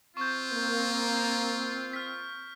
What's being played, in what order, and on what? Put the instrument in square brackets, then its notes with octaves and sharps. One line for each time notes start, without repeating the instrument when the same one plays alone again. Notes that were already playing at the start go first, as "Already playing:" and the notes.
[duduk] C4 [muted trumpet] F4 [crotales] C#6 G6
[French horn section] A#3
[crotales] F6 B6